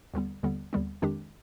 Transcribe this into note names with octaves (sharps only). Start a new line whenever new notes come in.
D#2 D3 G3 B3
D#2 D3 G3 B3
D#2 D3 G3 B3
F2 D#3 G#3 D4 G4